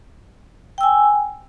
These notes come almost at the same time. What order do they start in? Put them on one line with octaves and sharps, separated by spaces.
G5 E6 G#5